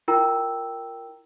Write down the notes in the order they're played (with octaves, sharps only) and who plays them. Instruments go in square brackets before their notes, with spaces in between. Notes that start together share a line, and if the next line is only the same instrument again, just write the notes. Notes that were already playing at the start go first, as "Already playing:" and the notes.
[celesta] E4 F4 A#4 G5 A#5 E6